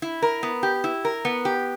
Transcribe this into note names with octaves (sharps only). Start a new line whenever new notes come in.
E4
A#4
B3
G4
E4
A#4
B3
G4